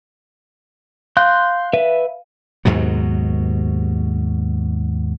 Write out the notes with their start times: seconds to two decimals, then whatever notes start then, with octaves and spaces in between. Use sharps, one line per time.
1.17 F5 C6 F#6 G6
1.73 B4 E5
2.65 D#2 G#2 B2 F#3